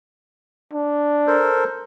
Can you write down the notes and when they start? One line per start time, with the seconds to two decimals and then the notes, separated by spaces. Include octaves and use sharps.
0.73 D4
1.27 A4 A#4 C5